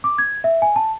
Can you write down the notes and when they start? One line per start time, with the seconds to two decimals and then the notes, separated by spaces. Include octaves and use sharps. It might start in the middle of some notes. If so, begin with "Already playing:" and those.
0.04 D6
0.18 G#6
0.44 E5
0.62 G#5
0.76 A5